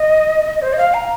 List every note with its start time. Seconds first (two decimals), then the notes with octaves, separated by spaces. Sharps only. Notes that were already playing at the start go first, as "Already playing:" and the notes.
Already playing: D#5
0.62 C5
0.73 D#5
0.78 F5
0.94 A#5